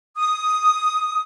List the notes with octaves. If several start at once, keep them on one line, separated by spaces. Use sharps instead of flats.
D#6